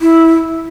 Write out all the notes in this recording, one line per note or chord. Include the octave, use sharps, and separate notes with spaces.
E4